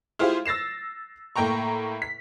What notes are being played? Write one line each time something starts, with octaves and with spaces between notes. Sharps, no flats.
E4 F4 G4 G#4 C5 F5
E6 A6 A#6 C7 E7
A2 A#3 G5 A#5 C#6
B6